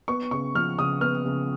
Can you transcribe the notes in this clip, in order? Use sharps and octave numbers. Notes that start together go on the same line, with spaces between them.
B3 C#6
C#3 C#6
F3 F6
C#3 D#6
B3 F6
C#3